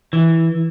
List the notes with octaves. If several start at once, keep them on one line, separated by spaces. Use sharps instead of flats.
E3